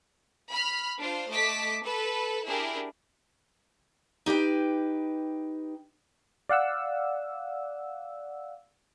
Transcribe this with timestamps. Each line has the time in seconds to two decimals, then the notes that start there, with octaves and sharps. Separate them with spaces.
0.50 B5 F6
0.99 D4 F4 C5
1.30 A3 D#5 A5 D6 B6
1.83 A4 B4
2.46 D4 E4 G4 G#4 A#4
4.26 D#4 G4 B4 G5
6.49 D5 F5 F#5 E6